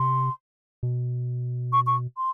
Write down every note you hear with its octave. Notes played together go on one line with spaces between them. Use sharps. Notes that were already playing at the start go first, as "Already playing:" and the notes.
Already playing: C3 C6
B2
C#6
C#6
C6